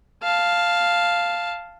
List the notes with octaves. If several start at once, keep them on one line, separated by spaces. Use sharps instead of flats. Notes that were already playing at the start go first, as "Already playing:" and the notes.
F5 A5